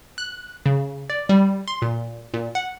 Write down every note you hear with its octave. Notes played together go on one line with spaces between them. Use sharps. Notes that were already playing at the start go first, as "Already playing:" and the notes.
F#6
C#3
D5
G3
C6
A#2
A#2
F#5